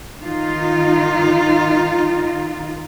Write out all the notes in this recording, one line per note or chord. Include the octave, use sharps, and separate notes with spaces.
D#3 D#4 F4